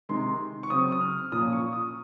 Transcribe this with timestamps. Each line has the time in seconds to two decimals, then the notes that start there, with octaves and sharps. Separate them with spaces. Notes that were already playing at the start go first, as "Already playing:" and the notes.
0.09 C3 D#3 G#3 C6
0.63 C#6
0.70 C#3 F#3 C4 D#6
0.92 D#6
1.01 F6
1.32 A#2 F3 A#3 C#4 D#6
1.53 C#6
1.73 D#6